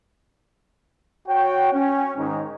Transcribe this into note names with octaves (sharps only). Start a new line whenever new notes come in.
F#4 C#5 G5
C#4
G#2 D#3 D#4